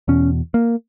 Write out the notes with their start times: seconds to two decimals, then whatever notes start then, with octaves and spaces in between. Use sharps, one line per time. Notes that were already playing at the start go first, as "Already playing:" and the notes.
0.08 E2 B2 C#4
0.54 A#3